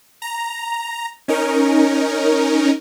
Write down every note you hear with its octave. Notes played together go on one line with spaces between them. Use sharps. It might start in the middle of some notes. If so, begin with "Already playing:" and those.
A#5
C#4 D#4 A#4